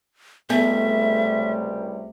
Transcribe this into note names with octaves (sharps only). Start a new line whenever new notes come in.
C#2 C3 G3 A3 B3 G#4 E5